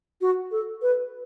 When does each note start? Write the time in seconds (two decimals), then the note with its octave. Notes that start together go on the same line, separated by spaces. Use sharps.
0.21 F#4
0.51 A4
0.82 B4